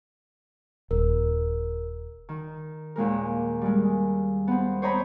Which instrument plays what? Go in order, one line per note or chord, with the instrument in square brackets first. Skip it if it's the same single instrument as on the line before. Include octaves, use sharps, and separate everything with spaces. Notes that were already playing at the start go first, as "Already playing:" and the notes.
[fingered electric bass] D#1 [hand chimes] A#4
[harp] D#3
D#2 A#2 G#3 A#4
G3 G#3
B3 C4
C5 C#5 D#5 G5 A#5 B5